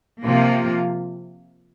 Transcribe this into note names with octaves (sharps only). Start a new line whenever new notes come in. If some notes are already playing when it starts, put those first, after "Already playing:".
C3 F3 A#3 F4